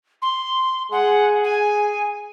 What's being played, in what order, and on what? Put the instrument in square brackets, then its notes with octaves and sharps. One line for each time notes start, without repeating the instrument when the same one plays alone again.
[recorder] C6
[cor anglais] G#4 [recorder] F#5
[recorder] G#5